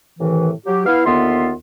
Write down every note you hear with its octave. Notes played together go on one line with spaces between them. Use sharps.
A2 C3 D#3 E3
F#3 G4
B3 E4 F5
D#2 D3 B3 F4 E5 C6